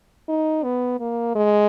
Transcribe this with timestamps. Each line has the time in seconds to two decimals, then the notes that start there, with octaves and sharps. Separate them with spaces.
0.29 D#4
0.64 B3
1.00 A#3
1.35 G#3